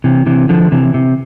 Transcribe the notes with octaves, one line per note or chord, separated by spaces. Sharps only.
C3 E3
C3 E3
D3 F3
C3 E3
C3